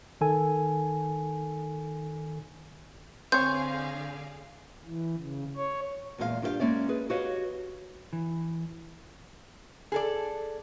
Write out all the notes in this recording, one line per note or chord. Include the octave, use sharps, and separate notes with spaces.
D#3 A4 G#5
D3 C4 G#4 C5 C#5 F5 G6
E3
C#3
C#5
E2 A#2 G#3 G#4 F5
G2 D4 F4 G4 B4 F5
G#3 A#3 C#4 D5 E5
G#4 B4
F#4 G4 B4 C#5 D#5 F5
E3
G#4 A4 D5